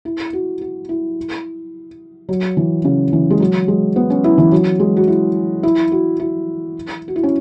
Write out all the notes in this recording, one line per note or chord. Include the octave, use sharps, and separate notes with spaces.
E4
F#4
F#4
E4
F#3
E3
C#3
E3
G#3
F#3
G#3
B3
C#4
E4
E3
F#3
G#3
F#4
E4
E4
F#4
E4
F#4
E4
C#4